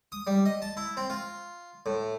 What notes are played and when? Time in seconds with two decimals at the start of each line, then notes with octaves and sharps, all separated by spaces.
0.12 D#6
0.27 G3
0.45 D#5
0.62 A5
0.77 E4
0.97 C4
1.10 F4
1.86 A2